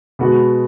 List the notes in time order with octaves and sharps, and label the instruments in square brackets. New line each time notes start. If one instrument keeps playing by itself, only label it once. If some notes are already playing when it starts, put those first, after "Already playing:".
[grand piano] B2 G#3 B3 F#4